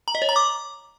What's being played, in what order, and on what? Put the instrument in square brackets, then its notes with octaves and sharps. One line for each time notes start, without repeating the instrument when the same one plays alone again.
[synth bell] A#5
D#5
C#5
A#5
D6